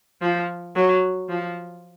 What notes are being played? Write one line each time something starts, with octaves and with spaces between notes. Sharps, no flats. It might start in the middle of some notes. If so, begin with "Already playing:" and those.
F3
F#3
F3